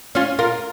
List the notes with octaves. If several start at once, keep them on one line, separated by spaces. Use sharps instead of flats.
C#4 F4
F4 A#4